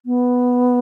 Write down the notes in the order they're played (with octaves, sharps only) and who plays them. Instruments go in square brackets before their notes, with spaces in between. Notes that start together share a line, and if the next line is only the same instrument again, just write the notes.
[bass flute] B3